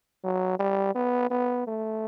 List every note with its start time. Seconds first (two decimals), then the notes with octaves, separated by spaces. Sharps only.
0.24 F#3
0.59 G3
0.95 B3
1.31 B3
1.67 A3